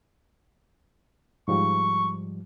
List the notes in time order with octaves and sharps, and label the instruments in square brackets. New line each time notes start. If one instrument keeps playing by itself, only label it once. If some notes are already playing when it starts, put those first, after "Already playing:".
[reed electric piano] G#2 F3 G3 [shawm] C#6